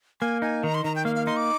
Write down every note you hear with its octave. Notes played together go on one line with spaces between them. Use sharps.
A#3 G#5
D#4 G#5
D#3 A#5
C6
D#3 A#5
G5
A#3 F5
F5
D#4 C6
D6